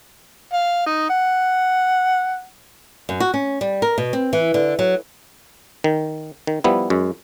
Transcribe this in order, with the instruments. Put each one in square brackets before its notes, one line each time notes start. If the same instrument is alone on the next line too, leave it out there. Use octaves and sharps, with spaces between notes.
[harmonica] F5
D#4
F#5
[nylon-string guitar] F#2
F#4
C#4
G3
A#4
B2
C4
E3
D3
F#3
[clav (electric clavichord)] D#3
D#3
F3 G3 B3 E4
F#2 G#3